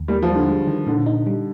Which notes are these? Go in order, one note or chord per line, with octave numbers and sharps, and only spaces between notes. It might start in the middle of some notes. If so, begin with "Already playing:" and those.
Already playing: D#2
G3 A#3
F3
G3
D3
G#3
D#3
A#2 D3
D#4
G3